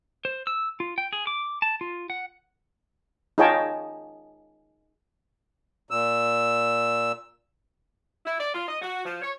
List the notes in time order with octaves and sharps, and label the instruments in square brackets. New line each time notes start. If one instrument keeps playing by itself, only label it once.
[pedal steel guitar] C5
E6
F4
G5
G#4
D6
A5
F4
F#5
[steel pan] D#4 F4 G#4 C#5 G5 A5
[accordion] A#2 E6
[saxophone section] E4
D5
F4
D#5
F#4
F3
C#5